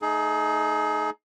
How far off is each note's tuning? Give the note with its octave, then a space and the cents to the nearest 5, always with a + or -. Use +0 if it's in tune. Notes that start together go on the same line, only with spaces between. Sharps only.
A3 +0 D#4 +0 G#4 +35